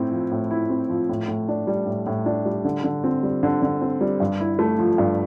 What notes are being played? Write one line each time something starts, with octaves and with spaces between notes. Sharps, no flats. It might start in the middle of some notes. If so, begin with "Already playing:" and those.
Already playing: A2 C4 E4
F3
A2
E4
C4
F3
A2
A2
D4
G3
A2
A2
D4
G3
D3
D3
C4
G3
D3
D3
C4
G3
G2
E4
A3
F3
G2